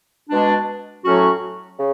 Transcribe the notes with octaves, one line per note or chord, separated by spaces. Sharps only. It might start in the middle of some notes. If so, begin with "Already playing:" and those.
B2 G#3 D4
A2 F#3 C#4 F#4
C#3